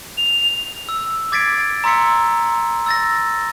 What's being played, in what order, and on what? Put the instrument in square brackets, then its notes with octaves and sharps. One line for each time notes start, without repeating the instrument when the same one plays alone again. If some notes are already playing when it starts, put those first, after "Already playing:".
[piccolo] F7
[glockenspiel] E6
D6 G#6 A6 B6 C7 D7
A#5 C6 E6 B6 C#7
E6 A6 A#6